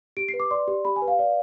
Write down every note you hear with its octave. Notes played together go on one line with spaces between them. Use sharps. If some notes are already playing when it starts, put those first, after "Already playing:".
G4 D7
C7
B4
D6
D5 C6
G4
G4 B5
G#5
B4
F5
D5